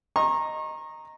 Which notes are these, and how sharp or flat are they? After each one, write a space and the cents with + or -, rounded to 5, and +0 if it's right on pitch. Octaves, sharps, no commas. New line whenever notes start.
D#5 +0 A#5 +0 C#6 -35